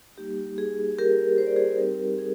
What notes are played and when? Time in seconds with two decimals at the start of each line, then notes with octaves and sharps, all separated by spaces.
0.18 G3 A#3 D#4 G4
0.58 G#4
0.99 G4 A#4
1.38 C5
1.47 D5
1.56 G#4 C5
1.78 G3 C4 D#4 G4 A#4
2.18 G#4